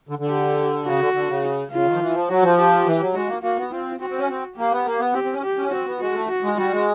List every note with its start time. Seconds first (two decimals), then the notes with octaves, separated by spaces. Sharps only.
0.09 D3
0.19 D3
0.28 G4
0.85 C#3 F#4
0.99 D3
1.14 D3
1.28 C#3
1.71 C#3 F4
1.85 D#3
1.93 F3
2.00 E3
2.14 F3
2.29 F#3 F#4
2.43 F3
2.57 G4
2.86 E3
3.00 F#3
3.14 G#3 F#4
3.28 A#3
3.42 A#3 F#4
3.56 B3
3.71 C4 F4
4.00 C4 F#4
4.10 C4
4.18 C#4
4.29 C4
4.57 A#3 G4
4.72 B3
4.86 A#3
4.99 B3
5.14 C4 G4
5.24 C4
5.33 C#4
5.43 G4
5.57 C#4
5.71 C4 F#4
5.86 B3
6.00 G#3 F#4
6.14 A3
6.28 F#4
6.43 G#3
6.57 G3 F#4
6.71 G#3